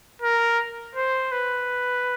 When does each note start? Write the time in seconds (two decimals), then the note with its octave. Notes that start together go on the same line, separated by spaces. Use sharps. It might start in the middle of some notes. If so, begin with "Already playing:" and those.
0.22 A#4
0.95 C5
1.32 B4